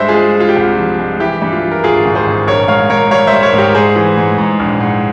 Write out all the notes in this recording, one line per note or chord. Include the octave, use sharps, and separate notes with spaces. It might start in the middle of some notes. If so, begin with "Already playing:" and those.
Already playing: G2 G#3 C5 E5
F4 G#4
G#3
G#3 F4
G4
C2 F4
F3
G#3
E3 E4 G4
G2
F4
E3
A#4
G#1 F4 G#4
G#1
G#4 C5
G#1
A#1 A#4 C#5
G#2 C#5 F5
G#2 A#4 C#5
G3 C#5 F5
C5 E5
G3
A#4 C#5
G#2
G4 A#4
G#2 G#4 C5
E3
G#2
G#2
A#1
G#2